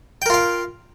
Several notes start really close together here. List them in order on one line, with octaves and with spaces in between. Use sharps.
G5 A#4 F4 F5